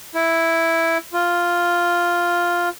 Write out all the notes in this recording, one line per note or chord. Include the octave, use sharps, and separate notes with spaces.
E4
F4